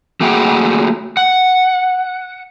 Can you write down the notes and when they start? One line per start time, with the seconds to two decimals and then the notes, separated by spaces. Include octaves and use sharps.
0.21 A3 A#3 F#4 G#4 G5
1.17 F#5